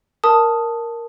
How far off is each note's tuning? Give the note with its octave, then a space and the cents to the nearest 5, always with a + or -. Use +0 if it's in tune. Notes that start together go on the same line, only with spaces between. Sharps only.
A#4 +0 A5 +0 D#6 +0